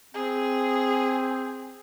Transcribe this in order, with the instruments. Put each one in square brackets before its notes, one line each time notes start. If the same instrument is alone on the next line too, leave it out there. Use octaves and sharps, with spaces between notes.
[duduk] C4 [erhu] G#4